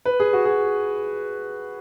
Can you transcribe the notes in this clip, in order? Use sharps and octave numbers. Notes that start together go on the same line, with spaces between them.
B4
G#4
F#4
G#4